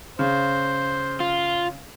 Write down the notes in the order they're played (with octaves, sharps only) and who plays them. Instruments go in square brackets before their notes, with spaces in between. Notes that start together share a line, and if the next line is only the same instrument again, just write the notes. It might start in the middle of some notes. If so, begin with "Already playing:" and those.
[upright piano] C#3 [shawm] C5
[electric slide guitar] F4